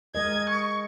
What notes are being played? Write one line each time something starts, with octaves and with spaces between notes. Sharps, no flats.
G#3 A#4 D#5 G#6
C#6